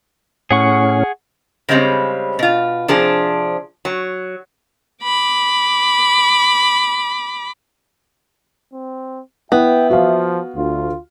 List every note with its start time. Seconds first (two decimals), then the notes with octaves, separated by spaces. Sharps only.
0.51 A2 C#4 G#4 F#5 C#6
1.69 C#3 G3 G#3 C4 C#4
2.39 B2 F4
2.88 C3 F3 D4 G#4
3.85 F#3
5.03 B5 D6
8.73 C4
9.52 B3 E4 E5 G5
9.90 F3 F#4 F5
10.55 D2 F4